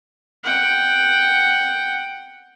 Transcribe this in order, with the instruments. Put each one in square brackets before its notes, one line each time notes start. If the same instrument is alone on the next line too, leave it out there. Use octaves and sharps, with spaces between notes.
[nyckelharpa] F#5 G5